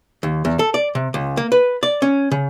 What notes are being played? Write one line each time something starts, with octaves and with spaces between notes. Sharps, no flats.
D#2
E2
A4
D5
C3
C#2
A#3
B4
D5
C#4
C#3